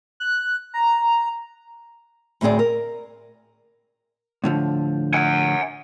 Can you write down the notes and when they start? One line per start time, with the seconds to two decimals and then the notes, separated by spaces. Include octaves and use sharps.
0.20 F#6
0.74 A#5
2.41 D2 A2 C4 G#4 D5
2.59 A#4
4.44 A2 D3 F3
5.14 F#5 G#5